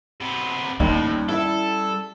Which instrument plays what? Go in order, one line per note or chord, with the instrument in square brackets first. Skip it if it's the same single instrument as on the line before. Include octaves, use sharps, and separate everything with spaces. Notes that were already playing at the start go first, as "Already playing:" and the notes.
[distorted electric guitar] C3 B3
[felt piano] D#2 [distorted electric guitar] A2 [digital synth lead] G3 [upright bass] C#4
[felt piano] E4 E5 [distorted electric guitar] A4